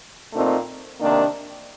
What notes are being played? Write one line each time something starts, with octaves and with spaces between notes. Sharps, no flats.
A#2 A3 C4 D#4
C3 D#3 A#3 D4